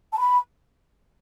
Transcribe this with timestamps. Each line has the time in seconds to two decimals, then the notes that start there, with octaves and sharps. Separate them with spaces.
0.12 A5
0.18 B5